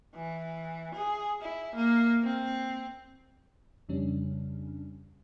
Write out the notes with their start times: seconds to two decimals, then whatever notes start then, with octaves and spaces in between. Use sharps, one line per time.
0.15 E3
0.95 G#4
1.42 E4
1.75 A#3
2.24 C4
3.89 F2 C#3 G3 C#4 D4